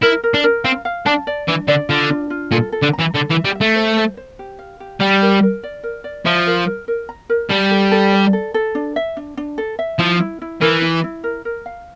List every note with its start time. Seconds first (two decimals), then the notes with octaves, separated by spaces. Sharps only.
0.02 E4 A#4
0.24 A#4
0.34 D4
0.44 A#4
0.64 C4 F5
0.85 F5
1.06 D4 A5
1.27 D5
1.48 E3 D4
1.68 D3 D5
1.89 D3 F4
2.10 D4
2.30 F4
2.51 A#2 A4
2.72 A4
2.82 D3
2.93 A#5
2.99 E3
3.14 D3 A4
3.30 E3
3.34 E5
3.45 G3
3.55 E5
3.61 A3
3.76 C5
3.96 C5
4.17 C5
4.39 G4
4.59 F5
4.80 G4
5.01 G3 G5
5.22 A#4
5.43 A#4
5.63 D5
5.83 A#4
6.04 D5
6.26 F3 E5
6.47 A#4
6.67 A#4
6.88 A#4
7.09 A#5
7.30 A#4
7.50 G3 A5
7.71 A4
7.92 A4
8.12 D5
8.33 A4
8.54 A4
8.75 D4
8.96 E5
9.17 D4
9.37 D4
9.58 A4
9.79 E5
9.99 F3 E4
10.20 E4
10.42 E4
10.61 E3 A#4
10.82 E4
11.04 E4
11.24 A#4
11.45 A#4
11.66 F5